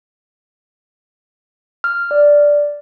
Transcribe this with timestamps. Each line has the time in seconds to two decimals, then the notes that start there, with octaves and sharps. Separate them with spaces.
1.84 F6
2.11 D5